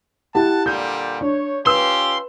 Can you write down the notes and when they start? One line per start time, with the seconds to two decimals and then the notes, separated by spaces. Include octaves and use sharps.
0.35 E4 G4 F#5 A5
0.66 A#2 D3 G3 G6
1.21 D4 C#5
1.66 C#4 F4 G4 B4 C6 E6